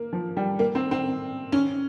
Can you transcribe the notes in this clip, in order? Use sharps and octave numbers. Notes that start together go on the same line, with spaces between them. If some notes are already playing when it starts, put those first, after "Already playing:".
Already playing: A#3
F3
G3
A#3
C4
C4
C#4